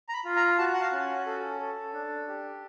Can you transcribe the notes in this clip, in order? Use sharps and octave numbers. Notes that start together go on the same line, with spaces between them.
A#5
B5
F4
A#5
F#4 A5
F#5
F5
C#4
A4
A4
D4
G4